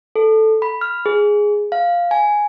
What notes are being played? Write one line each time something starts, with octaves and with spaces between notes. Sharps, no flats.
A4
B5
F6
G#4
F5
G#5